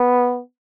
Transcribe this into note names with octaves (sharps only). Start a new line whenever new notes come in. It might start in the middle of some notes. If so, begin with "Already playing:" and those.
Already playing: B3